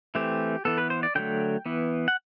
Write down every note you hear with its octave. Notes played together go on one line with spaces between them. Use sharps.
E3 A3 C4 G4
E3 B3 A4
B4
C5
D5
D3 F#3 A3 G5
E3 B3
F#5